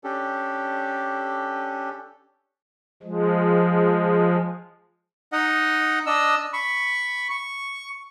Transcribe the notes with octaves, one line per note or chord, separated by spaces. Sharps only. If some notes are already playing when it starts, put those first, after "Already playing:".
C#4 D4 G4 A4
F3 G#3
D#4 D#5 F#5
D4 D#5 E6
B5 C#6
C#6